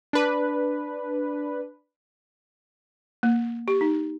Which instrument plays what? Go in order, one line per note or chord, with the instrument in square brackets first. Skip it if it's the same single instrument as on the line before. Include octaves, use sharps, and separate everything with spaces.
[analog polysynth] D4 B4
[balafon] A#3
G4
D#4